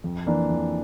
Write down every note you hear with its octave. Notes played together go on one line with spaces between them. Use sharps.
F2
E3 A#3 D4
F2